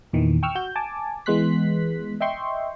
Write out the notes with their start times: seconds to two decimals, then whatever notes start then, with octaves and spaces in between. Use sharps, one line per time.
0.13 E2 A#2 D#3 E3
0.43 G5 C#6 E6 F6
0.55 F#4 G6
0.76 G#5 A5 D6
1.26 E3 G#3 B3 C6 F#6 B6
2.21 D#5 E5 G5 C6 C#6